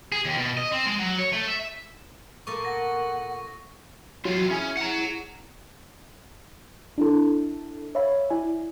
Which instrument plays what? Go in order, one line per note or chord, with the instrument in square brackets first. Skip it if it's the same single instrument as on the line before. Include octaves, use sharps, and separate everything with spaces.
[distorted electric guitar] G#4
D#2
B2
D#5
C4
G#3
F#3
C#5
A3
E5
[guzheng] A#2 A3 A#3 [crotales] C#6 [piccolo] D6
[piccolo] F#5 [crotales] A#6
[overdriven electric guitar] E2 F4 [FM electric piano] F#3
[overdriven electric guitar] C#4 [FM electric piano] E4 G#4 G#5
[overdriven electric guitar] F#5 A#5
[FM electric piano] D4 E4 A4
C#5 E5 F5 B5
E4 D5 E5 G#5